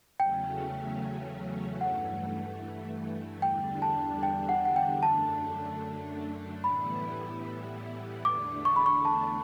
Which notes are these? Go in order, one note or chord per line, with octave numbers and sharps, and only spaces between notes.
E2 C#3 F#3 A3 C#4 G5
G2 E3 A3 F#5
E2 D3 G3 D4 G5
A5
G5
F#5
F#5
G5
F#2 D3 A3 D4 A5
A2 E3 G3 B3 E4 B5
E2 D3 A3 D4 D6
C#6
B5
C#6
A5